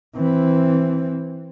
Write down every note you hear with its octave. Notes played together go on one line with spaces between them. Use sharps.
E3 C4